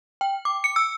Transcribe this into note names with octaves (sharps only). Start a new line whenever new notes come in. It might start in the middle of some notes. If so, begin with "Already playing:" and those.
G5
D6
C#7
E6